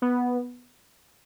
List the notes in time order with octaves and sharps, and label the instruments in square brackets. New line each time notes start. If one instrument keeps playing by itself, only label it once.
[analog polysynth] B3